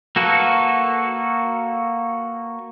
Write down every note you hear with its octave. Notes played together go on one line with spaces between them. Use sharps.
A#3 F#4 A4 B4